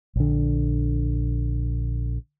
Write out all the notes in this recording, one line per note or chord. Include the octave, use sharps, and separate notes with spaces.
A#1 D3